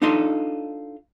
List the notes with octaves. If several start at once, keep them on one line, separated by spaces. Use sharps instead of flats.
D4 D#4 F4 A4 D#5 C6